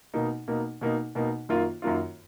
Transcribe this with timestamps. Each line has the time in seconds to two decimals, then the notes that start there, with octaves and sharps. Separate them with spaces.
0.14 B2 A#3 D#4
0.48 B2 A#3 D#4
0.81 B2 A#3 D#4
1.15 B2 A#3 D#4
1.49 F#2 D#3 A#3 F4
1.82 F#2 D#3 A#3 F4